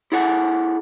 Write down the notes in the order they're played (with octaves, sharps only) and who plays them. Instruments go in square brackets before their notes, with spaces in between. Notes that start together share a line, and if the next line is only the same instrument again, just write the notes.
[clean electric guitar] E4 G#4 A4 F#5